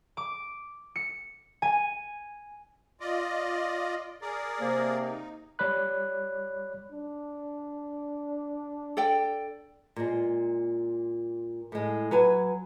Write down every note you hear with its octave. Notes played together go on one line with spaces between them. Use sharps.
D6
C#7
G#5
F4 D5 D#5
G#4 A#4 D5
C3 A#3
D#4
G3 C#5 D5 B5 F#6
D4
A4 D5 G5
A#2 G#3
A2 G#3
F#3 B4 G#5